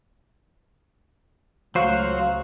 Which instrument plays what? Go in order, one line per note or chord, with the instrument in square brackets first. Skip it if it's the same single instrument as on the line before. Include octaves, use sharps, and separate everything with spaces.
[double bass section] C#2 A3 [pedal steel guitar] F#3 C5 [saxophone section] F#4 [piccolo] F5